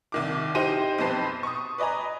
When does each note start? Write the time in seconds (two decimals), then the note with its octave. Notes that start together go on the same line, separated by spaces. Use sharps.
0.12 C2 D#3 D6
0.55 D#4 E4 G4 C5 D#7
0.98 B1 F2 B4 C5 A5 C7
1.43 C#6 D#6
1.78 B4 D5 D#5 G#5 A#5